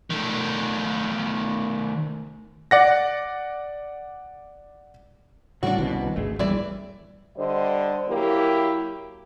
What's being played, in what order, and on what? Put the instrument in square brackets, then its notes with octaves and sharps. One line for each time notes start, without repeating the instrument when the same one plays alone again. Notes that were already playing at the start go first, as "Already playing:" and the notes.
[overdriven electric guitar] D#3 A3
[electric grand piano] D5 F#5 A#6
[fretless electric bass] A2 [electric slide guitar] C#3 G3 D5 [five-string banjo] D4 F#4
[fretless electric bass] C2 B2 [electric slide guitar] D#3 C#4
[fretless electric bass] G#1 D2 [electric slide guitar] A3 G#4
[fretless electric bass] A#1 E2 [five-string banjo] E3 E4 D5 [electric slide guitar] G3
[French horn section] D3 G3 C5 D#5
F#3 A#3 E4 G4